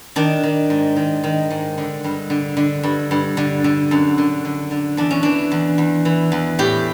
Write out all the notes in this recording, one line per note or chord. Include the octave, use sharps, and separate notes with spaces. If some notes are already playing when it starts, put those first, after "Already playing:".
D#3 D4
D#3
G#2
D#3
D#3
G#2
D3
G2
D3
D3
G2
G2
D3
D3
F#2
D3
D3
D3
E2 D4
C#4
E3 D4
E2
E2
E3
E2
A2 G4